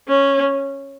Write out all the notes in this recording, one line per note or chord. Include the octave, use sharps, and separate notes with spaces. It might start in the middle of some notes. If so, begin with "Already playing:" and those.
C#4